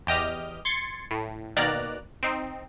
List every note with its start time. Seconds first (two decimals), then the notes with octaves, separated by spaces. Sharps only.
0.07 E2 G4 D#5 F6
0.65 C6 G#6 A6 C#7
1.11 A2
1.56 B2 D#3 A#3 D5 A#5 F#6
2.23 C4 D#4